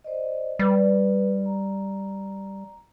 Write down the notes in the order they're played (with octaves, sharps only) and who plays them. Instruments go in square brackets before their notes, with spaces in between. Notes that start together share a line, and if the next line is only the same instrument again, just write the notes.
[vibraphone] C5 D5 D#5
[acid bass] G3 [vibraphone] B4
[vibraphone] A#5